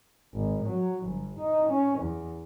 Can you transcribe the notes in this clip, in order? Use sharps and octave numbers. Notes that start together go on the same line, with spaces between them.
G#1
F#3
G1
D#4
C#4
E2